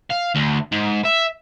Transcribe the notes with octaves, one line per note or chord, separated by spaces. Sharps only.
F5
D2
G#2
E5